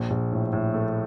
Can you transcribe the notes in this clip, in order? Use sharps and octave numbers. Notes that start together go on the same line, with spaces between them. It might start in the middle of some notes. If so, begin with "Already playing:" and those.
Already playing: A#1
A#1
A2
A2
A3